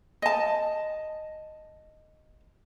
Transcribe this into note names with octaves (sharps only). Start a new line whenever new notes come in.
D#5 A5